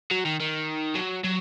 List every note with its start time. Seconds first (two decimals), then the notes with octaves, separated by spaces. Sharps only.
0.11 F#3
0.25 D#3
0.40 D#3
0.95 F#3
1.24 F#3